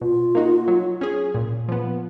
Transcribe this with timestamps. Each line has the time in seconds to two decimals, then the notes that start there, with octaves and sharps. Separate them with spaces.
0.01 B2 F4
0.35 A#3 D#4 F#4
0.68 F#3
1.01 C#4 G#4
1.34 A#2
1.68 F3 B3